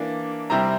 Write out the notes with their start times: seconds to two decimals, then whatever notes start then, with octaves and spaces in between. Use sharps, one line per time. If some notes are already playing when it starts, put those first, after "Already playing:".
Already playing: E3 A#3 D4
0.50 C3 G3 C4 E4 A#5